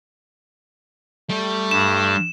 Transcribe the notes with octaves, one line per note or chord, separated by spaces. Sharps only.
G3 A3
G2 E7